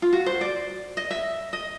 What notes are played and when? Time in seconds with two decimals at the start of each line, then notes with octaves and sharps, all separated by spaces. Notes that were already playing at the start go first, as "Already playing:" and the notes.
0.02 F4
0.13 F#4
0.26 C5
0.41 D5
0.97 D#5
1.11 E5
1.53 D#5